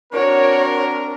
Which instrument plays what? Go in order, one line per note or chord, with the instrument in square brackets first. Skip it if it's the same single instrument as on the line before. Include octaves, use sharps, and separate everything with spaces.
[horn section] C4 D4 A#4 [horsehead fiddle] F#4 C#5